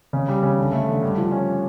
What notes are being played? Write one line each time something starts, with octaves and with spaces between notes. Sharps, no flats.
C#3
G3
C#3
D3
A3
D3
G2
F3
C#4